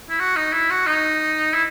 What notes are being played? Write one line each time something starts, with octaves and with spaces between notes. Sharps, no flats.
E4
F#4
D#4
E4
F#4
D#4
E4